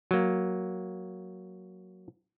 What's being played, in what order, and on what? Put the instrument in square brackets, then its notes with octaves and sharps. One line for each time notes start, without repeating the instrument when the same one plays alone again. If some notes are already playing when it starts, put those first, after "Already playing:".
[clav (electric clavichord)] F#3 A#3